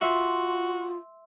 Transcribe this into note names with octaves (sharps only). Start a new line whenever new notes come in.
F4 F#4 E5 C6